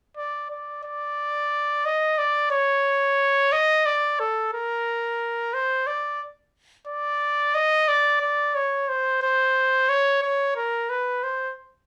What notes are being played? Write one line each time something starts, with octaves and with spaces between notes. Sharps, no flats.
D5
D5
D5
D#5
D5
C#5
D#5
D5
A4
A#4
C5
D5
D5
D#5
D5
D5
C#5
C5
C5
C#5
C#5
A#4
B4
C5